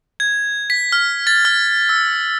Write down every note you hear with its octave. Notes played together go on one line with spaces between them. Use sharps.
G#6
B6
F6
A6
F6
E6